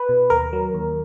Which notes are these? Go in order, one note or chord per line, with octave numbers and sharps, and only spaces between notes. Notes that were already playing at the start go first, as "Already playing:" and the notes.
Already playing: B4
B2
D#2 A#4
F#3
D#2